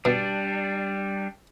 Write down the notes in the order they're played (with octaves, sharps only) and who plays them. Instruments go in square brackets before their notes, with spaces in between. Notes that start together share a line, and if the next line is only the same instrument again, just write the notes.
[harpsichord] B2 [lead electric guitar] G3 D4